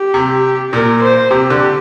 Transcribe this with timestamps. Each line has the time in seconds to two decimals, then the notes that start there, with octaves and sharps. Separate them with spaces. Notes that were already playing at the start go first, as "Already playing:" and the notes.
Already playing: G4
0.14 C3
0.72 A#2 A#4
1.02 C5
1.30 C3 G4
1.50 D3